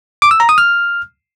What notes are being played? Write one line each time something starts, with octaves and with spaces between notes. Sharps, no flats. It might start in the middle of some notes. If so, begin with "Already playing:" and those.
D6
E6
A#5
D#6
F6